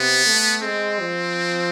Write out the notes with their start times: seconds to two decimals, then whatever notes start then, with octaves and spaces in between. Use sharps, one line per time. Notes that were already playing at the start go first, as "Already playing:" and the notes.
Already playing: C3 B3
0.26 A3
0.63 G#3 C4
1.00 F3